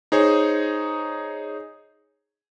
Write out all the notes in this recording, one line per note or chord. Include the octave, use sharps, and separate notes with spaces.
D#4 G#4 C5 C#5